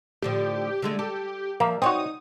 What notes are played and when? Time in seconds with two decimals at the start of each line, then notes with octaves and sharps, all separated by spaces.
0.22 A2 D3 F3 G4
0.82 D3 G#3 A3
0.99 G4 A4
1.60 F3 A#3 E5
1.82 C4 D#4 F#4 C#5 D#6